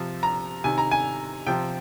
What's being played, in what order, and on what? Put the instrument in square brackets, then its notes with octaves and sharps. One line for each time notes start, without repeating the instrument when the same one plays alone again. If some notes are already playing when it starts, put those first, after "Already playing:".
Already playing: [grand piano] C3 F3
A#5
C3 D#3 G#5
A#5
G#5
C3 F3 G5